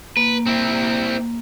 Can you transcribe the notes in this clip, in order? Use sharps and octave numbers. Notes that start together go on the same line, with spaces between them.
A#3 B4
C4 E4